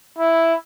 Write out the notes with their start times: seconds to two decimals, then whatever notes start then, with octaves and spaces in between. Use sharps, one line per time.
0.18 E4